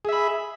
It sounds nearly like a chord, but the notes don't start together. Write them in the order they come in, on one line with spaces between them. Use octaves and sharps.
G#4 E5 B5